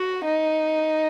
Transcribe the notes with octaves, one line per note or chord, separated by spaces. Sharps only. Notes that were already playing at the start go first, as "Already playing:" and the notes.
Already playing: F#4
D#4